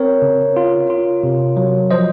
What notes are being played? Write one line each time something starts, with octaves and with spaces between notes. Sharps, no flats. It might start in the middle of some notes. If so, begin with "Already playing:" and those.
Already playing: C4 A#4 C#5
C#3
F4
F4
C3
F#3
F3 C5 D#5